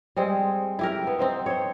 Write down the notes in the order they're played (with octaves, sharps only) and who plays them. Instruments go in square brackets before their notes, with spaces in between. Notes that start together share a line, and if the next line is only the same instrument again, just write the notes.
[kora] G3 G#3 C4 G#4
E4 G4 A#4
B3
C4 D#4 C5
C5 C#5